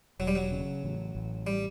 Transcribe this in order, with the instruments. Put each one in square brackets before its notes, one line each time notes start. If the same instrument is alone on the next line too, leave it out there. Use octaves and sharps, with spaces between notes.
[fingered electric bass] E1 [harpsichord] F#3
[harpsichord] G3
F#3
[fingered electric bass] C#3
A1
A1
[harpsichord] G3